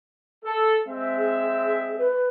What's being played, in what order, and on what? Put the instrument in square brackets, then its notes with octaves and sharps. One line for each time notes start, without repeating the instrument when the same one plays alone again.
[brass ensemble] A4
G#3 C4 E5
[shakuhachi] G#4
B4